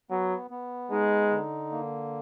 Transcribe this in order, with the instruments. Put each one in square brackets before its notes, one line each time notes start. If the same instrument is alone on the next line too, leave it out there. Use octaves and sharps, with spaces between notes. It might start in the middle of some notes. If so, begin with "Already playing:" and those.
[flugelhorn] F#3 [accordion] B3
[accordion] B3
[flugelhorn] G#3 [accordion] D#4
[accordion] D3
A#3